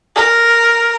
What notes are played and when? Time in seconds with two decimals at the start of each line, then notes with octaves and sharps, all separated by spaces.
0.15 A#4